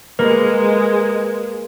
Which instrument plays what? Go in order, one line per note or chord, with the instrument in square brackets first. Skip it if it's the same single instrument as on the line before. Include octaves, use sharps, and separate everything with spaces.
[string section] G#3 [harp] A#3 [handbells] B4